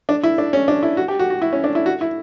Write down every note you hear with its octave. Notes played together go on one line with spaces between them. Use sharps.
D4
E4
D4
C#4
D4
E4
F#4
G4
F#4
F#4
E4
C#4
D4
E4
F#4
E4